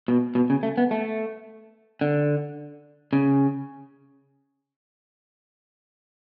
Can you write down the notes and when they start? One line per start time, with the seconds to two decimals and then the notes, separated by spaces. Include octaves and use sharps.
0.08 B2
0.35 B2
0.50 C#3
0.63 A3
0.78 B3
0.91 A3
2.01 D3
3.13 C#3